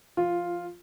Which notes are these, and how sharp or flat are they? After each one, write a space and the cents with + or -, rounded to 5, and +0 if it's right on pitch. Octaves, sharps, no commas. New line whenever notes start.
F3 -25 F4 +0